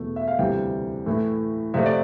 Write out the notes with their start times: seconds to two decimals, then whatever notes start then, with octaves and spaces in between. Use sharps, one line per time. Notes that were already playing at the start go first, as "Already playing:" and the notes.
Already playing: E2 B2 A3
0.16 E5
0.28 F5
0.39 D2 C3 E3 G3 G5
1.06 A2 E3 A3
1.74 F2 C3 F3 A3 E5
1.86 D5